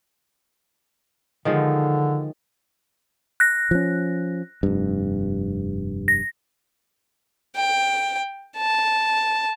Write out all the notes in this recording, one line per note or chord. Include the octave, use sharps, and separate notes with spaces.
D3 D#3 F3 G#3
F#6 A#6
F3 C#4
F1 G2
A#6
G5
A5